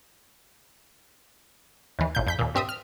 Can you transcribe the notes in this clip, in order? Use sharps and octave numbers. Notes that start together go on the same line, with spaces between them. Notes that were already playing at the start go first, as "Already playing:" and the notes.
D#2 E3
A1 A#2 G6
F2 G6 B6
D#2 A#2
G2 C4 E5 D#6
F6